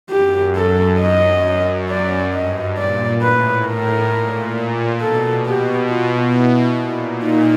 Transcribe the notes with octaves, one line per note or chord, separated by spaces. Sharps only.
F#2 G4
A4
D#5
F#2
D5
G2 D#5
A#2 D5
A2 B4
A2 A#4
A#2
B2 A4
B2 G4
F4
E4
A#2
D#4